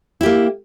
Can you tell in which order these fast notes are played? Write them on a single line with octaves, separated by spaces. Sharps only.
E4 G4 A#3